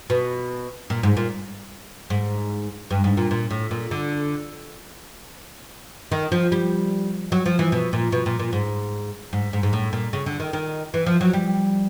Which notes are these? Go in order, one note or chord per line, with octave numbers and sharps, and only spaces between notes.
B2
A#2
G#2
A#2
G#2
G2
G#2
A#2
A#2
A2
A#2
D3
D#3
F3
G3
F#3
F3
E3
B2
A#2
B2
A#2
A#2
G#2
G#2
G#2
G#2
A2
A#2
C#3
D3
D#3
D#3
E3
F3
F#3
G3